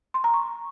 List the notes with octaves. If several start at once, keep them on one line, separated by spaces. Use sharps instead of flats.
C6
A#5
C#6